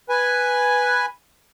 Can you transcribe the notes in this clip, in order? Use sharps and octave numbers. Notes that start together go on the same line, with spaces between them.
B4 G#5